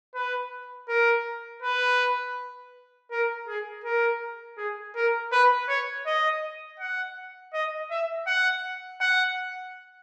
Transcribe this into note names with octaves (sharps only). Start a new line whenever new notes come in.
B4
A#4
B4
A#4
G#4
A#4
G#4
A#4
B4
C#5
D#5
F#5
D#5
E5
F#5
F#5